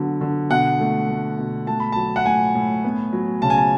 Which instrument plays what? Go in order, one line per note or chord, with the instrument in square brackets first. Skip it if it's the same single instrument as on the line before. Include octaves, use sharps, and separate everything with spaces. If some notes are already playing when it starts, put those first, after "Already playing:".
Already playing: [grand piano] D3 F#3 B3
D3
B2 F#5
A3
A3
B2
A3 A5
B5
F#3 A5
F#5
A2 G#5
A2
B3
F#3
C#3 A5
G#5
A5